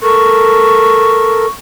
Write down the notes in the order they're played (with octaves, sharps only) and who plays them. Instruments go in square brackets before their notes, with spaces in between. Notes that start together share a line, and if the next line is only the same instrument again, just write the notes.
[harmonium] A4 A#4 [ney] C#6